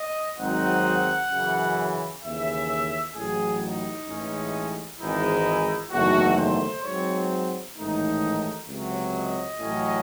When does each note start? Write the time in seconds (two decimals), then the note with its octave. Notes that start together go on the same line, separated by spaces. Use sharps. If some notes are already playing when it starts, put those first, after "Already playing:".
Already playing: D#5
0.39 G#1 G#2 F#3 C4 D#4 F#5
1.31 F#2 C#3 E3
2.23 D#2 C#3 E3 E5
3.15 A1 A2 F#3 G#4
3.61 D#4
4.07 A1 A2 E3 G#3 C#4
4.99 G#1 G#2 E3 G#3 D#4 E4
5.92 F#1 E2 D#3 A3 D#4 F#4
6.38 C5
6.84 G#2 F#3 C4 C#5
7.76 A1 G#2 D#3 A3 D#4
8.68 C#2 C3 F#3
9.14 D#5
9.61 A1 A2 F#3 C#4